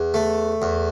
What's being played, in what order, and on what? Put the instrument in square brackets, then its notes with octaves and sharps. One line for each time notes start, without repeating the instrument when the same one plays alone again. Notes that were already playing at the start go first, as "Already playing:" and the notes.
Already playing: [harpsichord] E2
A3
E2